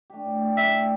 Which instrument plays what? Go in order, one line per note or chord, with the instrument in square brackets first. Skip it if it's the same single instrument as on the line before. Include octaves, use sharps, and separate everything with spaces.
[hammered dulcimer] A3 D4 G4
A2
A3 G4 D5
[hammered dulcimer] A2 [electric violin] E5
[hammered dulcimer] A3 G4 D5